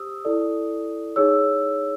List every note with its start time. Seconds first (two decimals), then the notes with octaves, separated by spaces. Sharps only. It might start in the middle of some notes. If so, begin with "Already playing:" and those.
Already playing: G4 C5 D#6 E6
0.25 E4 A4 D5
1.16 D#4 G#4 C#5 E6